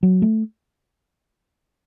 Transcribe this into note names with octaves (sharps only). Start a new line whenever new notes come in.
F#3
A3